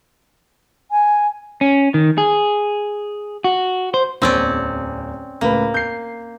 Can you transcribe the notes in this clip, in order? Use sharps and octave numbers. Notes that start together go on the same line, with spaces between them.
G#5
C#4
D#3
G#4
F#4
C5
D1 E2 C4 C#4 D5 E6
C#2 A2 A#3 B4
G6 C7